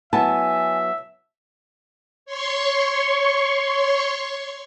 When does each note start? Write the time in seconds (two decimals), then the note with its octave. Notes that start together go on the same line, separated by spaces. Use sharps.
0.13 F#3 B3 E4 E5 G#5 A5
2.26 C#5 C6 C#6